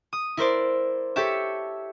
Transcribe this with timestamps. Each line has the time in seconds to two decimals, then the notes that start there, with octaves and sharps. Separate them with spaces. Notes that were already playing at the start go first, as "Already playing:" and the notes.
0.13 D#6
0.37 E4 A#4 C5 D5
1.16 G4 A4 C#5 E5